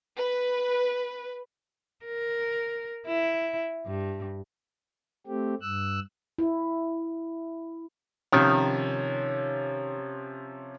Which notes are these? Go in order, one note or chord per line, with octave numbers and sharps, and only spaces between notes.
B4
A#4
E4
G2
A3 C4 G4
G2 E6 F#6
E4
C3 D#3 F3 C#4